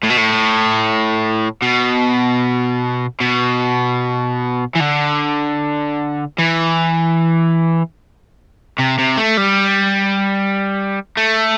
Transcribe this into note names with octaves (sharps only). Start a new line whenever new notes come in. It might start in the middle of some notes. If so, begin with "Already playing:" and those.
A2
B2
A2
B2
B2
E3
D3
E3
C3
C3
A3
G3
A3